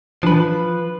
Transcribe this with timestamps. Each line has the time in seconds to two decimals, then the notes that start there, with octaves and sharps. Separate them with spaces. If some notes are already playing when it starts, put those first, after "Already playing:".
0.23 E3 F3 D4 B4